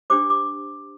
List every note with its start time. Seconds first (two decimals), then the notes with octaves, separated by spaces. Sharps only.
0.10 D4 G4 C5 D6
0.30 D6